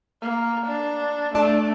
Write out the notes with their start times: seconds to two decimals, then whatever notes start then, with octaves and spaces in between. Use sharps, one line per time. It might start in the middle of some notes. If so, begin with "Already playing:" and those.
0.22 A#3
0.67 D4
1.35 A3 D4 D5 A5